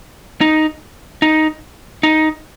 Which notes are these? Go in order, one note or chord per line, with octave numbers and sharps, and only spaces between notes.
D#4
D#4
D#4